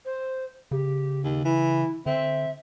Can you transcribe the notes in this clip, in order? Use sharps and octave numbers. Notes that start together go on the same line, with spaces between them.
C5
C#3 G4
D#2
E3 E4
D3 C4 E5